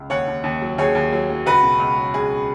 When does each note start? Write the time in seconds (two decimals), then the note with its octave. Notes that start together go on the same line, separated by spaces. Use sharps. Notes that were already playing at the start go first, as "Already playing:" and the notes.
Already playing: C#2
0.10 D#2 C#5 F#5
0.27 D#2
0.44 D#2
0.62 F#3
0.78 D#2 G#4 C#5
0.95 D#2
1.12 F#3
1.30 F#3
1.46 C#2 F#4 B4
1.63 B2
1.80 C#2
1.97 F#3
2.14 C#2 G#4